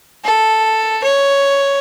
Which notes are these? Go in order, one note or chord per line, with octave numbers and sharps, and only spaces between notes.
A4
C#5